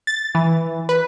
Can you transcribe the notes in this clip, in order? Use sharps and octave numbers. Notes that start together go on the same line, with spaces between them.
A6
E3
B4